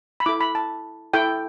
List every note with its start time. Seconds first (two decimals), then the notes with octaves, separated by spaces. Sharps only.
0.20 B5
0.26 E4 A4 D6
0.41 B5
0.55 A5
1.13 E4 A4 G5